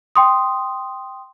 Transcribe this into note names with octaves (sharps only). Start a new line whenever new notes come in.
G5 C6 D#6